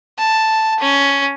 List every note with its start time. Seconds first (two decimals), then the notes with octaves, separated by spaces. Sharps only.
0.18 A5
0.80 C#4